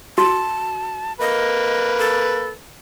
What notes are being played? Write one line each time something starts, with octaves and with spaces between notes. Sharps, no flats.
F#4 A5
A#3 B4 D#5
A4